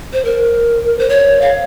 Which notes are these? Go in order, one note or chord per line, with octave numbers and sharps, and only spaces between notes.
C5
A#4
C5
C#5
F5